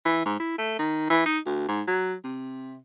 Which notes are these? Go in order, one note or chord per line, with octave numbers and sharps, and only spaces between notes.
E3
G#2
E4
A3
D#3
E3
D#4
D2
G#2
F#3
C3